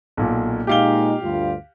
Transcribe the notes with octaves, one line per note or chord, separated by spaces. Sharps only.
B1 A#2
A#2 G#3 D#4 G4 F5 G7
D2 G2 F4